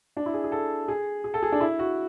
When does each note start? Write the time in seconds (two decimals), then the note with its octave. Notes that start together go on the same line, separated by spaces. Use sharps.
0.17 D4
0.26 E4
0.34 G#4
0.44 G#4
0.52 A4
0.88 G#4
1.24 G#4
1.34 A4
1.43 G#4
1.52 D4
1.61 E4
1.79 F#4